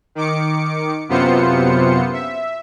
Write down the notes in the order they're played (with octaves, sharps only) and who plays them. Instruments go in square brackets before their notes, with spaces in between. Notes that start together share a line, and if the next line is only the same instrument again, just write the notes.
[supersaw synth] D#3 D6 C#7
F#2 C3 B3 F4 C5 C#7
E5